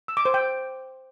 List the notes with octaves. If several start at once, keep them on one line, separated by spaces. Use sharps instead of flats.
E6
D6
C5
G5